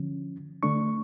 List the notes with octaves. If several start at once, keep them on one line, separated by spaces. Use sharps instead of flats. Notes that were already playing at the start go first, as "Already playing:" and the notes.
Already playing: D3 F3 C#4
D3 A3 D4 C#6